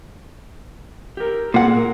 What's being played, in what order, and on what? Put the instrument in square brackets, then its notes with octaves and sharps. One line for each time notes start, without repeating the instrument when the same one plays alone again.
[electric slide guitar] G4 A#4
[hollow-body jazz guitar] A#2 F#5 [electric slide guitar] A#3 G#4 A4
[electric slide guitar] A#4